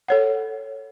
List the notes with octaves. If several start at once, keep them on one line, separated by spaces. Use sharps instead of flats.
A4 C#5 F#5